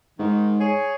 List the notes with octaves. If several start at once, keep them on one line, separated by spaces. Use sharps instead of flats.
G#2 D#3
G#4 C#5